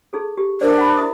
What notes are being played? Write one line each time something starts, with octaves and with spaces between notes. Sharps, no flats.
D#4 G#4 A4
G4
D4 A#4 C5 D5
F#5 B5
E4 E5 D#6